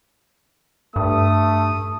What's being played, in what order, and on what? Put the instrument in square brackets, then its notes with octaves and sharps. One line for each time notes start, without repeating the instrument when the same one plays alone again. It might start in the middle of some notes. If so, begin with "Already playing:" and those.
[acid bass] G2 [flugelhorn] A3 [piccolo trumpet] D#6